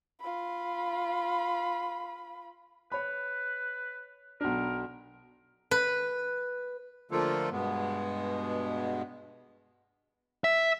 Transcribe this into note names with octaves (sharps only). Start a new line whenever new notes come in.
F4 B5
B4 C#5 B5
B1 D4 A#4
B4
D3 F3 A3 A#3 F4 A4
G2 B2 G#3 B3
E5